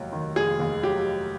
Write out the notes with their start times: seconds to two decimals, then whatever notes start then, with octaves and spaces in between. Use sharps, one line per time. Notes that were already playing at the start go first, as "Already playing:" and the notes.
Already playing: F1 D#2 F#3
0.13 D#3
0.36 F1 G#4
0.60 D#2
0.83 F#3 G4